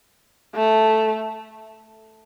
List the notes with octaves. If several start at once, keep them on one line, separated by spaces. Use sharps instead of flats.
A3